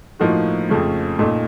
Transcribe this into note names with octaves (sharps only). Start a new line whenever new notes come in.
A2 F3 A#3 D#4 F#4
F2 C#3 F3 A3 C#4
A#2 A3 D#4